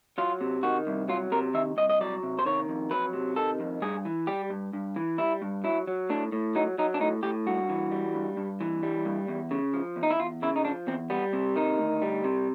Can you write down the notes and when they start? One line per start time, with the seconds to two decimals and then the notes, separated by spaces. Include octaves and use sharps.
0.18 F#3 F4
0.41 C3
0.63 D#3 F#4
0.87 C2
1.08 F#3 F4
1.32 C3 A#4
1.54 D#3 E5
1.77 C2 D#5
1.90 D#5
2.01 F#3 D5
2.23 C3
2.39 C5
2.46 D#3 C#5
2.69 F2
2.91 F#3 B4
3.13 C3
3.36 D#3 A4
3.60 F2
3.82 G2 G#4
4.05 E3
4.27 G3 G4
4.50 G2
4.73 G2
4.96 E3
5.18 G3 E4
5.42 G2
5.64 F#3 E4
5.88 F#3
6.10 A2 D4
6.32 A2
6.55 F#3 D#4
6.78 F#3 D#4
6.94 D4
7.00 A2 D#4
7.23 A2 G4
7.46 G2 F#4
7.69 E3
7.92 G3
8.14 G2
8.37 G2
8.61 E3
8.83 G3
9.05 G2
9.28 E2
9.51 C#3
9.73 F3
9.96 E2
10.03 D#4
10.10 E4
10.19 E2 F4
10.42 C#3 E4
10.56 D#4
10.64 F3 D4
10.87 E2 C4
11.10 G3 B3
11.33 C3
11.56 D#3 D#4
11.78 D2
12.02 G3
12.24 C3